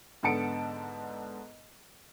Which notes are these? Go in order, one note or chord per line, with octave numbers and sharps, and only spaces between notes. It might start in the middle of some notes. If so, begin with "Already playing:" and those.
G#2 D3 B3 A5 C#7 D7